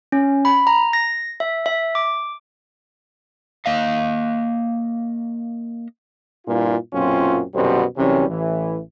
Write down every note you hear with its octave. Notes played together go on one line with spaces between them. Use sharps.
C#4
B5
A#5
A#6
E5
E5
D6
A#3 D#5 F5
G2 A#2 E4 F4
B1 F#2 A#2 C4 C#4 F4
C2 F#2 B2 D3 G3 C5
F#2 C3 E3 G3 C#4
A1 E3